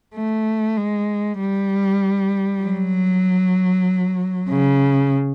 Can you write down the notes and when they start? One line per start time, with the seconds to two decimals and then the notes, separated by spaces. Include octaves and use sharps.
0.15 A3
0.77 G#3
1.39 G3
2.63 F#3
4.49 C#3